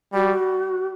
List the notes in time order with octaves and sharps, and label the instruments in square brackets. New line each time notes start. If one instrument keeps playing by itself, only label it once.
[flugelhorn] G3 [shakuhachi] F#4